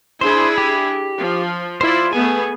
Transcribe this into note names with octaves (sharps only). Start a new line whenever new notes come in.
D4 E4 G#4 C5
G4
F3
E4 F4 C5 D5
A3 B3 G#4 G#5